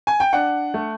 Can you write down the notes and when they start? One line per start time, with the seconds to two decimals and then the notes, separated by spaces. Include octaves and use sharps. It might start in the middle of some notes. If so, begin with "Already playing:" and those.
0.07 G#5
0.20 G5
0.33 D4 F#5
0.74 A3